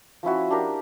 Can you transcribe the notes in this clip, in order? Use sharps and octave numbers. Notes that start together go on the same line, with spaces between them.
F3 C#4 E4 F#4
D4 G4 A#4